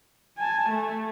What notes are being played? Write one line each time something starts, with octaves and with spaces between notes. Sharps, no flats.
G#5 A5
A3